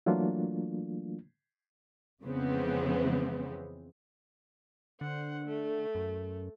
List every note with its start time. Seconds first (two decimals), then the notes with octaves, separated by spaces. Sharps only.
0.06 E3 F#3 A3 A#3 D4 F4
2.23 F2 C#3 E3 G#3 B3 C4
5.01 D3 C5 F#5
5.44 A3
5.95 F#2